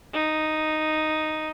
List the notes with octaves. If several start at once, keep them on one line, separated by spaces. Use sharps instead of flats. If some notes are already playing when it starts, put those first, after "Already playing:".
D#4